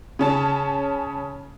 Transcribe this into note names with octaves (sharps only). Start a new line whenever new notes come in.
C#3 C#4 A5